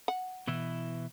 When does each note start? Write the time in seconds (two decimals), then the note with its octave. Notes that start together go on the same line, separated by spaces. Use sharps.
0.08 F#5
0.47 B2 E3 E4